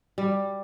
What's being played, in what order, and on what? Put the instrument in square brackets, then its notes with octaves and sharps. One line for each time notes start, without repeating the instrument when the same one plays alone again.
[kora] G3